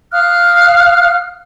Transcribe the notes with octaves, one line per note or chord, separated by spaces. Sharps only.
F5 D#6 F6 F#6